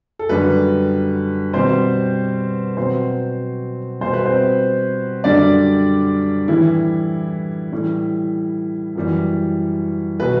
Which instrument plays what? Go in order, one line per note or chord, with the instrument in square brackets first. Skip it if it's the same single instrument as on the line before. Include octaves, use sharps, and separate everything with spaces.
[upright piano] A4
F#2 D3 G3 B4
B2 G3 C4 C5
B2 F#3 C4 C5
B2 G3 C5
B4
C4 C5
F#2 D3 G3 D4 D5
A2 E3 G3 E4 E5
A2 E3 G3
F#2 E3 G3
B2 F#3 B4